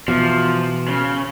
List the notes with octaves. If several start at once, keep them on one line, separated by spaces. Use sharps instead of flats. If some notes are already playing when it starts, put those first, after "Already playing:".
E2 B2 F3
C#3